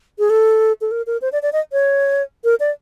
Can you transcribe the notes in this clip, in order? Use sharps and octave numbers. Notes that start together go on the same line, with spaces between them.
G#4
A4
A4
A#4
A#4
C5
D5
D5
D#5
C#5
A#4
D5